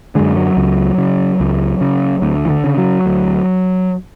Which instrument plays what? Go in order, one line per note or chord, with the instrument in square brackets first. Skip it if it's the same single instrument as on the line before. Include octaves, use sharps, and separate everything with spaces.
[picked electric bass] F#2 D3 G#3
F#3
C#2
C#3
C#2
C#3
D2
E3
D3
C#3
F#3
D2